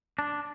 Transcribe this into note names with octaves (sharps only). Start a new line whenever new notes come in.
D4